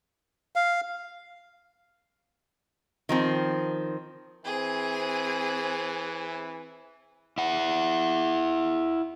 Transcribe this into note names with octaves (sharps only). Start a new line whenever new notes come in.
F5
D#3 F3 C4
E3 C4 G#4
E4 F#5